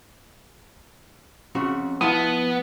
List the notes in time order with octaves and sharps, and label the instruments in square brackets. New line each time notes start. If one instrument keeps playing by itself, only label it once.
[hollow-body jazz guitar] F2 C#3 F#4
[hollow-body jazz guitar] F3 E4 A5 [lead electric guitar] B3 [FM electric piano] D#6